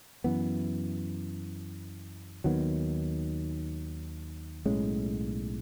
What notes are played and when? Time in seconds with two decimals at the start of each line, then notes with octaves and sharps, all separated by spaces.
0.24 F#2 E3 B3
2.44 D#2 D#3 F#3 B3
4.66 B1 A2 G#3 C#4